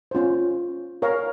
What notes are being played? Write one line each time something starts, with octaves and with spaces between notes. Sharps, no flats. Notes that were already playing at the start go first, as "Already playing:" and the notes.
C#4 F4 C5
A#4 C#5 F5 A#5